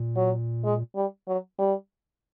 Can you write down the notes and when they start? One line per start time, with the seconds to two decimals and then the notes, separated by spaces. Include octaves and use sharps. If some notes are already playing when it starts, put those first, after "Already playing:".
Already playing: A#2
0.16 F#3
0.64 G#3
0.96 G3
1.28 F#3
1.59 G3